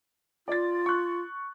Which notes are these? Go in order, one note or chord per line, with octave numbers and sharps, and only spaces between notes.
F4 D5 A6
C#6 F#6